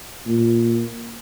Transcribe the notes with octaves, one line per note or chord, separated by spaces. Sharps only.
A#2